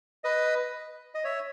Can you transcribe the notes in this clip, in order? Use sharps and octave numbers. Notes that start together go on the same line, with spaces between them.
B4 D#5
D#5
C#5 E5